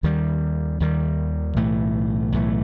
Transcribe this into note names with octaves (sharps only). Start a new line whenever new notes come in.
D#2 D#3 G3
D#2 D#3 G3
B1 A2 E3 A3
B1 A2 E3 A3